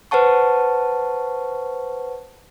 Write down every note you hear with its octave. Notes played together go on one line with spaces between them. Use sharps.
B4 C5 F#5 A5 C#6